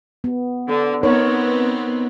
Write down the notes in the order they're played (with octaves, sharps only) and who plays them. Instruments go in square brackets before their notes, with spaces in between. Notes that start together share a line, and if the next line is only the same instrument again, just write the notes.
[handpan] B3
[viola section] D3
[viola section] B3 C4 [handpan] D#4 A#4 C#5